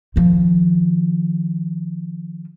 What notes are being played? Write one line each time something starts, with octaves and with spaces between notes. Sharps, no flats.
D#3 F3